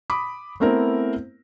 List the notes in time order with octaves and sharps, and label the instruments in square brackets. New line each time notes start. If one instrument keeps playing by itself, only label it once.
[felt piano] B5 D6 D#6
A3 B3 C4 E4 A#4